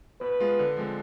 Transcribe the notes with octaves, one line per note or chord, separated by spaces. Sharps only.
B2 B4
G#3 B3 F4
D3
F3 G#3 C4